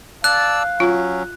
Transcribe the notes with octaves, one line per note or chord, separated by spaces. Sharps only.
D5 F5 A5 E6 F#6
F#3 C#4 F4